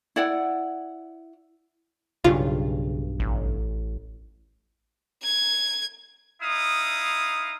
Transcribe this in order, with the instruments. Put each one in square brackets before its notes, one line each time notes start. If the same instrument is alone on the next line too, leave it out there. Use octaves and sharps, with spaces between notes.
[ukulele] E4 D5 F#5
[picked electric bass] B1 G2 [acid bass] C#3 [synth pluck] F4
[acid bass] A1
[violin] G#6
[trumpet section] D#4 E4 F5 D#6